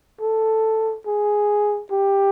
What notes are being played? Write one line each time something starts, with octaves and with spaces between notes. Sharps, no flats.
A4
G#4
G4